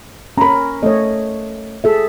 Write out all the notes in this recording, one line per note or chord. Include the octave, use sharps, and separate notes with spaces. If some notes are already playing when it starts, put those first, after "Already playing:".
C#4 A#4 A#5 B5
A3 C#5 D#5
G#4 A4 E5